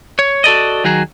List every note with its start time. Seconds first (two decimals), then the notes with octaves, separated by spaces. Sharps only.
0.19 C#5
0.44 F#4 A4 D5 D#5
0.84 D#3 F#3 F#4 G#4